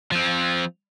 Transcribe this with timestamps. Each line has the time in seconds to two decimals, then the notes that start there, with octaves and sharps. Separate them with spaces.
0.12 F3 C4